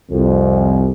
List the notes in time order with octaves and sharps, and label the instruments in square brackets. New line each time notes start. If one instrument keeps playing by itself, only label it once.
[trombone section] C2 F2